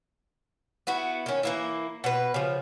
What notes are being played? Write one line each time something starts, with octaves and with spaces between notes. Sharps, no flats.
B3 E4 F#4
D#3 C#4
E3 A#3 E4
B2 B4
C#3 F3